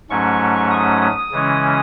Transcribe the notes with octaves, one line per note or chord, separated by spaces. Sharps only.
G#2 F#3 A3 C#4 C#6
D#6
D#6
C#3 E3 G#3 C#4